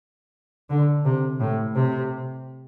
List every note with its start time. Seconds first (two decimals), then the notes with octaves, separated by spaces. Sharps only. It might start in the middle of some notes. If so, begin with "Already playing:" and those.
0.70 D3
1.05 C3
1.40 A2
1.75 C3